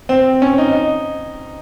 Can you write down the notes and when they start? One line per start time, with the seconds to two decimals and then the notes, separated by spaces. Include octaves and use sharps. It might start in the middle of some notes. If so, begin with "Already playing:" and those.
0.09 C4
0.42 C#4
0.58 D#4
0.73 D#4